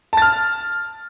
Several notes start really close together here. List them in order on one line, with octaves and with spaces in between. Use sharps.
A5 A6 F6